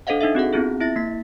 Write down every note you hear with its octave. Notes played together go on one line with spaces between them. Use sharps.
D4 A4 C5 D#5 F5 F#5
D4 D#4 A4 E5
C4 F#4 G#4 F#5
B3 C4 E4 F4 G#4
E4 E5 A6 A#6
A#3 B6